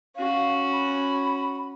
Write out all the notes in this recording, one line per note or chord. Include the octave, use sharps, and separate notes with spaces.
C#4 F#4 F5
B5